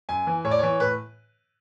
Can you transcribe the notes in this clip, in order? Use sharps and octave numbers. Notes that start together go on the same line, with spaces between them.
F#2 G#5
E3
A2 C#5
D5
E3 C#5
A2 B4